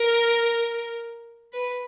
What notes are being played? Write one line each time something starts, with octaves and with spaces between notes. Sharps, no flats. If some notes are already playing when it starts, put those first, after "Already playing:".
Already playing: A#4
B4